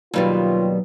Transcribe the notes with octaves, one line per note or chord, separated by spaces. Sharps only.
D#2 B2 F#3 G3 F4